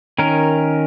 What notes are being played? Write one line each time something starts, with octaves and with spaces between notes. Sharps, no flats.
D#3 C#4 A#4